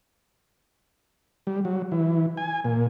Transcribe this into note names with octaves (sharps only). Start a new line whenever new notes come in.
G3
F#3
E3
G#5
A#2